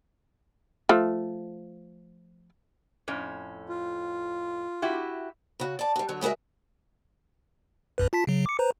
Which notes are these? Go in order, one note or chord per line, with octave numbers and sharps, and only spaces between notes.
F3 A3
F2 A2 C#4
F4
E4 F#4 G4
C#3 F#4
D5 A5
G3 F#4
D3 F#3
C#3 G#3 F#4 A#4 E5
A#1 F#2 B4
F4 A5 B6
C#3 F#3
D6 C#7
B4 C5 A#5